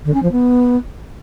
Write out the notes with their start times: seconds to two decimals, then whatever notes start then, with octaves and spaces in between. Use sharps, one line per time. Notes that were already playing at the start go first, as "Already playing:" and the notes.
0.05 D3
0.13 C#4
0.22 F3
0.31 B3